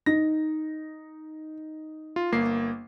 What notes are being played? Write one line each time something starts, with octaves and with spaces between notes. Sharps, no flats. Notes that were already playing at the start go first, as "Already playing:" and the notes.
D#4 A#6
F4
G1 A#3 C7